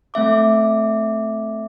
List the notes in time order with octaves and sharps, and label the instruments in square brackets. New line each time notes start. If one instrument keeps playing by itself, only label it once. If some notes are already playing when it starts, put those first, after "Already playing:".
[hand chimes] A3 C4 E5 D6